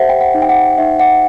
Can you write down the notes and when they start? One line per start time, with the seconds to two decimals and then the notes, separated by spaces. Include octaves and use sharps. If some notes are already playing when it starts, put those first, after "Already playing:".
Already playing: G4 C5 E5 F#5
0.09 G5
0.21 F#5
0.34 D#4
0.42 G5
0.49 F#5
0.78 D#4 E5
0.99 F#5